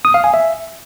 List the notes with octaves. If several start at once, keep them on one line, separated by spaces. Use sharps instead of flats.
D#6
F5
G#5
E5